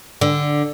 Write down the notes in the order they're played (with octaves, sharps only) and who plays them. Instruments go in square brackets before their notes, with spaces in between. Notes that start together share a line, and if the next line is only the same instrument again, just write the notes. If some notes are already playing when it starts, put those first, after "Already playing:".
[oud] D3